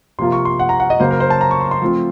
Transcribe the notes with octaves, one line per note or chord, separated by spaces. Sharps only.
C3 F3 A#3 F4 C6
C#6
C6
F#5
A#5
F#5
D#5
C#3 F#3 A#3 C5
A#4
C5
A5
A#5
C#6
C6
C6
F3 A3 C4 F4